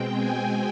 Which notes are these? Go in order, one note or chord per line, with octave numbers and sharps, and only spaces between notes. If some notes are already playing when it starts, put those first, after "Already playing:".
Already playing: B2 G#3 C4 G5
G#5